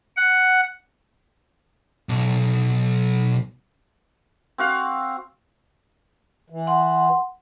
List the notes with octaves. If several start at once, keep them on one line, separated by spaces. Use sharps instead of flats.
F#5
B1
C4 F#4 F5
E3
F#5 C6